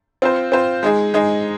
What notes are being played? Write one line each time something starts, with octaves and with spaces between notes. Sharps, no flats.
C4 F4 C5
C4 F4 C5
G#3 D#4 G#4
G#3 D#4 G#4